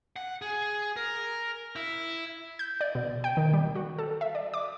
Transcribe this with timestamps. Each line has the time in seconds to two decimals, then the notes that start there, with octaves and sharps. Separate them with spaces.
0.16 F#5
0.42 G#4
0.96 A#4
1.76 E4
2.59 G6
2.81 D5
2.95 B2
3.24 G5
3.37 D#3
3.53 G3
3.75 F#4
3.99 A4
4.21 E5
4.35 D5
4.54 D6